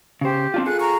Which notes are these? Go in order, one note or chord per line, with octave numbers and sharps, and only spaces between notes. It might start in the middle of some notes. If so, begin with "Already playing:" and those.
C#3 G4 C5
C4 D4 F4
F4 G#4 A4 F#6
A#5 C#6